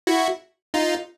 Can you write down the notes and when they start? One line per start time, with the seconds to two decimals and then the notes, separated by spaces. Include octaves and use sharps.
0.07 E4 F#4
0.74 D#4 F4